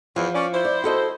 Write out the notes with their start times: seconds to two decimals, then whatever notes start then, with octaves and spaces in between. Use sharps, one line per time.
0.16 E2 E3 F3
0.34 C#4 D5
0.53 E4 C5
0.65 D5
0.84 F#4 A4 D#5